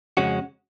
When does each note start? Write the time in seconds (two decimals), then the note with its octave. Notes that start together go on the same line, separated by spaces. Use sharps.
0.17 F2 C#3 G#3 C#4 F#4